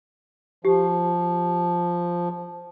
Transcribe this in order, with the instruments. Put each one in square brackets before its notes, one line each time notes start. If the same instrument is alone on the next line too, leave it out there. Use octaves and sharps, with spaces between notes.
[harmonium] F3 [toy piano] G4